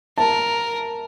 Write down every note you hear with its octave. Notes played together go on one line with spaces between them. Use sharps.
A#4 A5